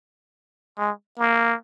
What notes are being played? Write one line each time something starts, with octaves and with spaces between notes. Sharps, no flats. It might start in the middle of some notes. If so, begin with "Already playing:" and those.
G#3
A#3